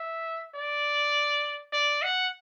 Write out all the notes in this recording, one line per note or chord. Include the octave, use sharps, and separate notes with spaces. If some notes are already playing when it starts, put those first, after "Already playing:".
Already playing: E5
D5
D5
F#5